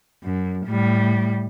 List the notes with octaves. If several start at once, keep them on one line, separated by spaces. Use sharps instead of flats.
F#2
A2 G3